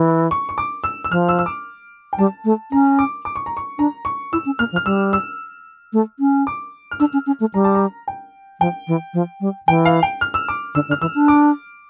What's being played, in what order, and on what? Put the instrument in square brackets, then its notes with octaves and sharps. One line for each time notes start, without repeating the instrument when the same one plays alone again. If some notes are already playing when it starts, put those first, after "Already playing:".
Already playing: [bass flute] E3
[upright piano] C#6
C#6
D6
E6
E6
[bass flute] F3 [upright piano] F6
[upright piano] E6
E6
D6
G5
[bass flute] G3 [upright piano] A5
[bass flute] A3
[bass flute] C#4 [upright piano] A#5
[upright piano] D6
D6
C#6
A#5
C#6
[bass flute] D4 [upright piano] A#5
[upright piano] C#6
[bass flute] E4 [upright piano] E6
[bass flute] C#4
[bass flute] A#3 [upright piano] F6
[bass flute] F3
[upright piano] F6
[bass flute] G3 [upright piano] E6
[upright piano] E6
[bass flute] A3
C#4
[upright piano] D6
F6
[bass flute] D4 [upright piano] E6
[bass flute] C#4
C#4
A3
[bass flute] G3 [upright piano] A#5
[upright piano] A5
A#5
G5
[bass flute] F3 [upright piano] G5
[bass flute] E3
F3
G3
[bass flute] E3 [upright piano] G5
[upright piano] F5
G5
F6
E6
D6
[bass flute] D3 [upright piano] E6
[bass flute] D3
[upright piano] F6
[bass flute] E3 [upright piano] E6
[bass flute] D4
[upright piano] D6